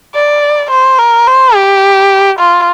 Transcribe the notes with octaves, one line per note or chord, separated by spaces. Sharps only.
D5
C5
A#4
C5
G4
F4